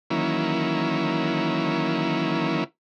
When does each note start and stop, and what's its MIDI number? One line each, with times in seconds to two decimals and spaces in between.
0.10 2.64 51
0.10 2.64 52
0.10 2.64 54
0.10 2.64 58
0.10 2.64 61
0.10 2.64 64